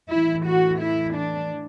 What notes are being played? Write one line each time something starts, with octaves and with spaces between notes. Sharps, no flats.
A2 E3 E4
F#4
E4
D4